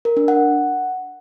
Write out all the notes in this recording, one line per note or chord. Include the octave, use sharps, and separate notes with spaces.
A#4
D4
F#5